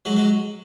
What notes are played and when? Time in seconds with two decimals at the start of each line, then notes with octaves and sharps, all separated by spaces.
0.05 F#3 G#3
0.16 F#3 G#3